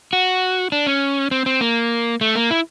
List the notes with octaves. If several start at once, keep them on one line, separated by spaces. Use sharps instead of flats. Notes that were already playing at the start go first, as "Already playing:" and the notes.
F#4
D4
C#4
C4
C4
A#3
A3
A#3
E4